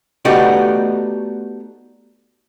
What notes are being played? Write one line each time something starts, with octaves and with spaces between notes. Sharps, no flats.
A3 B3 D#4 F#4 G4 D5